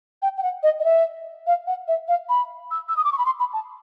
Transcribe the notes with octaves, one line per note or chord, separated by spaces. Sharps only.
G5
G5
F#5
D#5
D#5
E5
F5
F#5
E5
F5
B5
E6
E6
D#6
D6
C#6
B5
C6
B5
A5